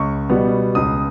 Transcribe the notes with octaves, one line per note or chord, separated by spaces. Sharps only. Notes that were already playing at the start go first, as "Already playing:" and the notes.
Already playing: C#2 C#6
B2 G3 B3
C#2 D#6